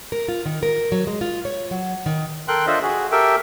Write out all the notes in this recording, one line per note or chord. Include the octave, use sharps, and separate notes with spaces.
A#4
F4
D#3
A#4
F#3
G#3
F4
C#5
F#3
D#3
A4 A#4 G5 C6 F#6
D4 F4 A4 C5 D#5 E5
F#4 G#4
G4 A4 A#4 E5 G5